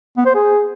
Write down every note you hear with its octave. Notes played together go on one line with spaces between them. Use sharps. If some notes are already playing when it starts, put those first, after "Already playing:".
B3
C5
G#4